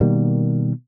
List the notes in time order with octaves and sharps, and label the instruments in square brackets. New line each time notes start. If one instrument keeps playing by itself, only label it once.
[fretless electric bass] B2 D#3 G3 A#3